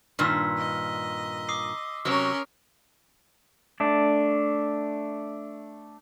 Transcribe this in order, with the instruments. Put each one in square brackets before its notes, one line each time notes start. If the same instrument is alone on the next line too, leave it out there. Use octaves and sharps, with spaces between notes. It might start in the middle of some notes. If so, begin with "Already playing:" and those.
[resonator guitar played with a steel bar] G2 A#2 D#3 [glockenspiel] C6 E6 B6
[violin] D#5
[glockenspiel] D6 D#6 C7
[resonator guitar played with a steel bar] C3 F#3 [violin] C#4 A#4 [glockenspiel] F6
[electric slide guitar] A3 D4